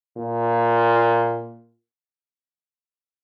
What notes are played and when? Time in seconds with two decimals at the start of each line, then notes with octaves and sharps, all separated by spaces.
0.17 A#2